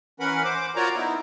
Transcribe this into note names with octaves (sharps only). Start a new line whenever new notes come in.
E3 C#4 A#4 B4 F#5 B5
C5 D6
F4 F#4 A#4 C#5 D5 A#5
B3 D#4 E4